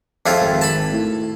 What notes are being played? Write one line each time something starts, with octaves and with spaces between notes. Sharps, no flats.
F2 E4 F4
G#1
A5 B5
A2